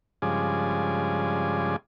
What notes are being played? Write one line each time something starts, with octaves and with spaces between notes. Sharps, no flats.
G2 C#3 F3 G#3 D5 G#5